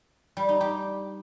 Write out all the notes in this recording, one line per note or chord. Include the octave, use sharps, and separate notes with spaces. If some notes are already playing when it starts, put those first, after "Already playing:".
G3
D#4
G4